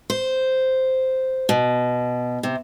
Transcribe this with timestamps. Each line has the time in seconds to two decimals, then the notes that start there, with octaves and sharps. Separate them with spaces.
0.10 C5
1.49 B2
2.43 C3